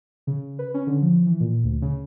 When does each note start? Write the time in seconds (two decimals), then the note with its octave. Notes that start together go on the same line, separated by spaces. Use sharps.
0.27 C#3
0.59 B4
0.74 C#4
0.87 D3
1.02 F3
1.26 E3
1.40 A#2
1.64 D2
1.82 C#3